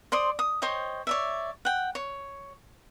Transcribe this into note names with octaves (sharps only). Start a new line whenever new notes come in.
C5 D5 C6 D#6
D#6
C5 C#5 D#5 G5
C#5 D5 E5
F#5 G5
C#5